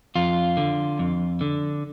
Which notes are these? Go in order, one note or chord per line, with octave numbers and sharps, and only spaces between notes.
F2 F4
D3
F2
D3